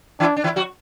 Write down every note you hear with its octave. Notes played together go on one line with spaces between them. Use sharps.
E3 D4 E4
D4
E3 E4
F#3 F#4